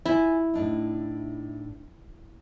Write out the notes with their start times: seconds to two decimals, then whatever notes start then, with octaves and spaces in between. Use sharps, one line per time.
0.06 E4 F4 G#5
0.54 A2 D4 D#4